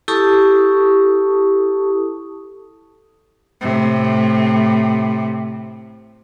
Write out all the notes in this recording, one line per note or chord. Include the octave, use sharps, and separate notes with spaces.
E4 G4 A4 A5 C#6 D#6
A2 C3